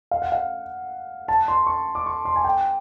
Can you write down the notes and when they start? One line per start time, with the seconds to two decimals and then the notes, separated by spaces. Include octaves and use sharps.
0.11 F5
0.22 F#5
0.32 F5
1.28 A5
1.48 C6
1.67 C#6
1.95 D6
2.06 C#6
2.25 C6
2.36 G#5
2.44 G5